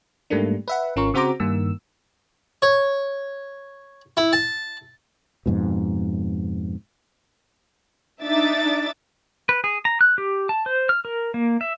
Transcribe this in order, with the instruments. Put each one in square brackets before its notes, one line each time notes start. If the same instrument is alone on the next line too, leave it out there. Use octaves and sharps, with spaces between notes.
[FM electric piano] G#2 G3 A3 A#3 D4
B4 E5 F#5
G#1 C#4 F4 A#4 C#6
C#3 C4 F#4 C5 A#5 D6
G2 D#3 A#3 E6
[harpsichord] C#5
E4
A5
[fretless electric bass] F2 G#2 B2
[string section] D4 D#4 E5 D6 A6
[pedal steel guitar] B4
G#4
A#5
F#6
G4
A5
C5
F6
A#4
A#3
E5